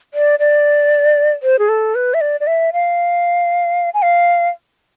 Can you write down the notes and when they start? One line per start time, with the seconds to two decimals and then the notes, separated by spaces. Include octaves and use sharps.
0.14 D5
0.39 D5
1.43 C5
1.59 G#4
1.69 A4
1.95 B4
2.14 E5
2.21 D5
2.40 D5
2.47 E5
2.73 F5
3.94 G#5
4.02 F5